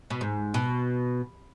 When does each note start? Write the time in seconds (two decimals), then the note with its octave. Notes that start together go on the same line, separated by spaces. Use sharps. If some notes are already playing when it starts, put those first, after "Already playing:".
0.10 B2
0.21 G#2
0.54 B2